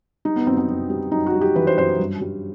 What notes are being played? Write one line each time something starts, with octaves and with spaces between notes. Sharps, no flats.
G3 D#4
B3
F#2 C4
C4
F#2
G3
F#2 D#4
F#4
G3
G4
E3 B4
C5
F#2 C5
G2
G3